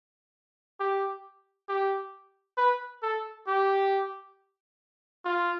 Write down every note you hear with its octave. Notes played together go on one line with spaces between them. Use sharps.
G4
G4
B4
A4
G4
F4